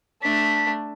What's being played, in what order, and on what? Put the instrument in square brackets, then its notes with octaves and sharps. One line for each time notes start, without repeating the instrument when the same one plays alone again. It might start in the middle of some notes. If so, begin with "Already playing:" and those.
[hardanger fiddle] A3 D4 [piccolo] B6